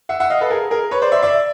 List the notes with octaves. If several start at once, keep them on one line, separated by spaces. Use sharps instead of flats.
E5 F#5
E5 F#5
D#5 F5
A4 B4
G#4 A#4
G#4 A#4
B4 C#5
C5 D5
D5 E5
D5 E5